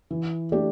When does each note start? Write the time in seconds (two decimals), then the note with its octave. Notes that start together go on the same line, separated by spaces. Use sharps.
0.11 E3
0.52 A3 D4 G4 D5